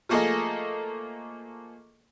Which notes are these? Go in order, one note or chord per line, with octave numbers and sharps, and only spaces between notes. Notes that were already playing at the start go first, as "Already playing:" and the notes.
F3 A3 A#3 G#4 A4 D#5